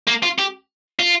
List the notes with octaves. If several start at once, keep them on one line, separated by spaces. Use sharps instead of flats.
A#3
F4
G4
F4